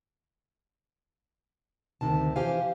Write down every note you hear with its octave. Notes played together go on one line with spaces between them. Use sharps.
D2 C3 D#3 A5
E3 F3 G4 C5 F5 G#5